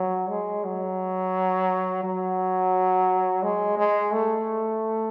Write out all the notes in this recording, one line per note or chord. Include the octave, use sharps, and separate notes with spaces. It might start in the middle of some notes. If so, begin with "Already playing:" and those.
Already playing: F#3
G#3
F#3
F#3
G#3
G#3
A3